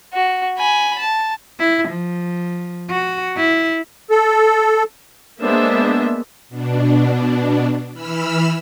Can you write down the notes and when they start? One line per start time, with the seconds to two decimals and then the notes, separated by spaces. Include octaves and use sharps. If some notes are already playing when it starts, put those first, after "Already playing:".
0.13 F#4
0.58 G#5 B5
0.98 A5
1.59 E4
1.89 F3
2.90 F#4
3.37 E4
4.11 A4
5.39 G#3 A#3 B3 D4 C5 E5
6.49 B2 D4
7.93 E3 B5 E6 F6